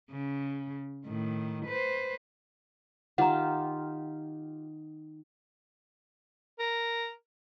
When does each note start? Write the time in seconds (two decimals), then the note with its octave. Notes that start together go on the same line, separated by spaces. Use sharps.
0.11 C#3
1.06 A2 D#3
1.66 B4 C5
3.18 D#3 F4 G4 F#5 A#5
6.59 A#4